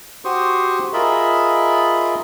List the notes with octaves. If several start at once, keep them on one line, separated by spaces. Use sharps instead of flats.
F#4 G4 C5 C6 C#6 D#6
F4 G#4 A#4 D#5 E5 B5